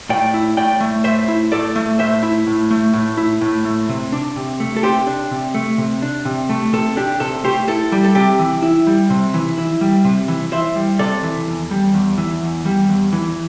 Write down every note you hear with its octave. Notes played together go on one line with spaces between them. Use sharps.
A2 D5 G5
E4
A2 D5 G5
A3
A2 C5 E5
E4
A2 A4 D5
A3
A2 C5 E5
E4
A2
A3
A2
E4
A2
A3
C3
D4
C3
A3
A4
C3 G4 C5
D4
C3
A3
C3
D4
C3
A3
C3 A4
D4 G4
C3 A4
A3 G4 C5
E4 A4
G3
A4
C3 G4
E3
E4
G3
C3
E3
E4
G3
C3
E3
E4 C5 E5
G3
C3 A4 D5
E3
E2
G3
E2
E3
E2
G3
E2
E3